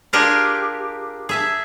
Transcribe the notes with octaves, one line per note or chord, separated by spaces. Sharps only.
D4 F4 G4 G#4 A#4 D5
G#4 E5 A5